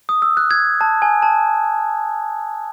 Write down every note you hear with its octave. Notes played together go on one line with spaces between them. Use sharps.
D#6
E6
F#6
G#6
A5
G#5
A5